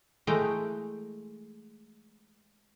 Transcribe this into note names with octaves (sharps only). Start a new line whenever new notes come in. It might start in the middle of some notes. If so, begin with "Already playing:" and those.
E3 G#3 A3 G5 A#5